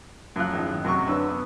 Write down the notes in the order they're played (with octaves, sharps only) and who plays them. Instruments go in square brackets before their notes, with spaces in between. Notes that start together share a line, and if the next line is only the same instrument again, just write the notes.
[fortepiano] F#2 C#3 F3 F5 F#6
G#1 A2 D#4
F#2 C3 F#4 C#6
D3 C#4 D4 B4 E6
B3